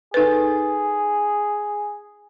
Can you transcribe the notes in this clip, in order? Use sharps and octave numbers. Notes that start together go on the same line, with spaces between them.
D#4 G#4 A4 B4